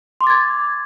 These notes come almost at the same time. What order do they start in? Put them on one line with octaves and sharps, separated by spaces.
C6 D6 A6 G#6